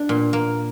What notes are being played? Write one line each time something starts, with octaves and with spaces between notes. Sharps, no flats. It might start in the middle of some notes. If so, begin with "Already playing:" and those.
Already playing: D4
A#2
A#3